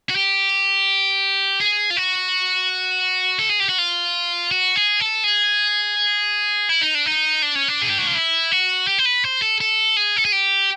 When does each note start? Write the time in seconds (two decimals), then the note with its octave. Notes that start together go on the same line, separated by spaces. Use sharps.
0.10 F#4
0.16 G4
1.61 G#4
1.90 F4
1.97 F#4
3.39 A4
3.49 G#4
3.60 G4
3.69 F#4
3.78 F4
4.51 F#4
4.76 G#4
5.00 A4
5.24 G#4
6.69 E4
6.81 D#4
6.95 D4
7.06 D#4
7.42 D4
7.55 C#4
7.68 D4
7.82 G#4
7.90 G4
7.98 F#4
8.07 F4
8.15 E4
8.51 F#4
8.87 G4
8.99 C5
9.05 B4
9.24 C5
9.42 A4
9.61 A4
9.97 G#4
10.17 A4
10.25 G#4
10.32 G4